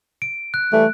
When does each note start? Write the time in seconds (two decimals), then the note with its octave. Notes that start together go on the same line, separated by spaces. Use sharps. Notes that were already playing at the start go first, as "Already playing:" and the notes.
0.22 D7
0.54 F#6
0.73 E3 G3 A3